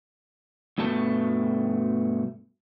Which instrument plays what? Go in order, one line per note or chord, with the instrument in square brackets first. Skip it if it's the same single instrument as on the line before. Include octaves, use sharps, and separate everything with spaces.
[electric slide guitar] G2 B2 A3 A5